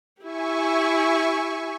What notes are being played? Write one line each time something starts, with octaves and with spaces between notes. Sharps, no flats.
E4 G4 E5 G#5 C#6